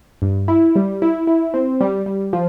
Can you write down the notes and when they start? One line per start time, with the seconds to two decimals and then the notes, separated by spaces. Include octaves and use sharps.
0.22 G2
0.48 E4
0.76 G3
1.02 E4
1.27 E4
1.54 C4
1.81 G3
2.06 G3
2.33 F3